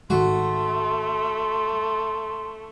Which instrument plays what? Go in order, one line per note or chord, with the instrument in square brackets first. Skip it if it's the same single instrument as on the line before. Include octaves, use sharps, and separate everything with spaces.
[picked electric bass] G#2 D#3 G#3 [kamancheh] A3 [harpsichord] F#4 [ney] C6